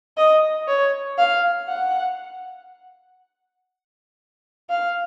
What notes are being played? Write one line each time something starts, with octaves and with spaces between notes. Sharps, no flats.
D#5
C#5
F5
F#5
F5